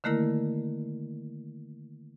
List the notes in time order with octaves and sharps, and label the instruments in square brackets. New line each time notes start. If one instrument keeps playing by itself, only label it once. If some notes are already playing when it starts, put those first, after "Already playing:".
[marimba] D3 D#3 A3 A#3 E4 A#4